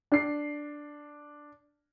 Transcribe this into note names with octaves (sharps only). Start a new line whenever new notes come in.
D4 C7